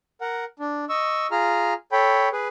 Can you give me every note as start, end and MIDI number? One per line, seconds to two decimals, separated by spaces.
0.21 0.45 70
0.21 0.45 78
0.60 0.85 62
0.89 1.27 75
0.89 1.27 85
0.89 1.27 88
1.31 1.73 65
1.31 1.73 68
1.31 1.73 82
1.31 1.73 89
1.92 2.29 69
1.92 2.29 73
1.92 2.29 79
1.92 2.29 83
2.33 2.48 68
2.33 2.48 71